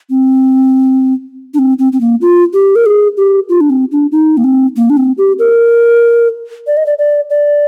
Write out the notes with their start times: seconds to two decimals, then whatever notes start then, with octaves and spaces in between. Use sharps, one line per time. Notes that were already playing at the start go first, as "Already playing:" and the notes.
0.10 C4
1.54 D4
1.59 C4
1.79 C4
1.93 C4
2.01 A#3
2.21 F4
2.53 G4
2.76 A#4
2.86 G#4
3.17 G4
3.49 F4
3.61 D4
3.70 C4
3.92 D4
4.12 D#4
4.37 A#3
4.44 C4
4.77 A#3
4.90 D4
4.97 C4
5.18 G4
5.39 A#4
6.67 D5
6.77 D#5
6.86 D5
6.99 D5
7.30 D5